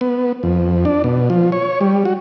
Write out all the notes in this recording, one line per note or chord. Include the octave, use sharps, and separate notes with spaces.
B3
F2
D4
B2
F3
C#5
G3
F#4